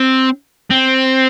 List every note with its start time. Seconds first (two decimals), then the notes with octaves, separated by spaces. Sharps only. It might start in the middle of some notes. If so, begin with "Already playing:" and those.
Already playing: C4
0.71 C4